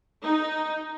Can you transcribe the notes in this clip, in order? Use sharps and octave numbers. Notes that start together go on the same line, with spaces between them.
D#4